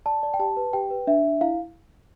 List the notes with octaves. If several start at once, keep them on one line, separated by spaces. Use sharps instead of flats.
D5 A5
D5
G5
G4 A5
B4
G4 G5
B4
D4 E5
D4
E4 F5